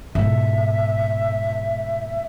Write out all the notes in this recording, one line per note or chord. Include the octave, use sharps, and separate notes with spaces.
G#2 B2 E5